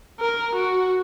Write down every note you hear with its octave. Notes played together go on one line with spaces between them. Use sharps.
A#4
F#4